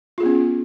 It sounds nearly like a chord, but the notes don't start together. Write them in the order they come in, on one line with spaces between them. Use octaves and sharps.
F4 G#4 B3 C#4